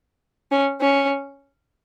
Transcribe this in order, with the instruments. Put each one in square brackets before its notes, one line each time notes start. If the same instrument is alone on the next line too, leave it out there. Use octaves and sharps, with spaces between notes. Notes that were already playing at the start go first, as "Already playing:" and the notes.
[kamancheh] C#4
C#4